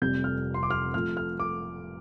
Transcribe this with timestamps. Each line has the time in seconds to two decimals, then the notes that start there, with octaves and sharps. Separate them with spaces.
0.02 F1 F2 C3 G3 G6
0.24 F6
0.54 C6
0.63 D6
0.70 F6
0.93 F2 F3 A3 F6
1.17 F6
1.40 D6